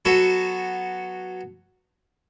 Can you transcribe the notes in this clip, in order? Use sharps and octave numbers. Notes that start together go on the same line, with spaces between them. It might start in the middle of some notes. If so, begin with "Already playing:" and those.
F#3 B3 F#4 A4